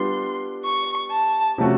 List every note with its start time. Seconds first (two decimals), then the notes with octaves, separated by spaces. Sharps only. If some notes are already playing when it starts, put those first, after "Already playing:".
Already playing: G3 B3 D4 F4 C6
0.65 C#6
1.12 A5
1.58 C3 F3 A3 C#4 F#4